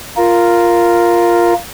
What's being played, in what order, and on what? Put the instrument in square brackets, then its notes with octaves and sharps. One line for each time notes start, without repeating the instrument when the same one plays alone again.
[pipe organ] F4 A#4